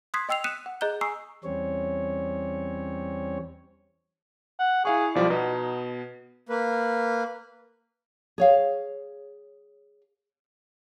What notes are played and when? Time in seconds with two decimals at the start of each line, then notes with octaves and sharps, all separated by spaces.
0.14 C6 D#6 F#6 G#6 B6 C7
0.29 D#5 G5 E6 C7 F7
0.44 D#6 F#6 B6 C#7 D#7 E7
0.66 F#5
0.81 G#4 D#5 A#5 F#6 G6 G7
1.01 G#5 A#5 C#6 D#6 E6 C7
1.44 E2 G3 C4 C#4 C#5
4.59 F#5
4.85 E4 G#4 F5 C#6
5.15 B1 F3 G3 D5
5.30 B2 B3 D#4
6.49 A#3 B4
8.38 G#4 C#5 F5